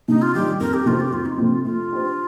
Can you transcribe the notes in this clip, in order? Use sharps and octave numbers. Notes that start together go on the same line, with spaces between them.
C3 D#4
F4
D#3 G3 G4
F2 A#4
G4
C3 F3 A3 C4 F4
G4
F2 F4
D#4
C3 F3 A3 C4 F4
A3 F4
D4 G4 C5